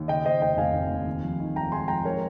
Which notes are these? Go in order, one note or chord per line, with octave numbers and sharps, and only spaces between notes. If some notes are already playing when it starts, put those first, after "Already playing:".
Already playing: D#2
C#3 D#5 G5
D#2 C5 D#5
F1 D#5 G5
F1 F5 G#5
F1
D#2
D#3
F2
D#3
F2 G5 A#5
G#3 G#5 C6
F2 G5 A#5
G#3 A#4 C#5